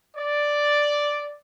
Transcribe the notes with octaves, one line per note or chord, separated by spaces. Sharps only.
D5